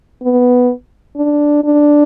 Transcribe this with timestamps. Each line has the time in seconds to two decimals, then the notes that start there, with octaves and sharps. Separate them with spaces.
0.22 B3
1.17 D4
1.64 D4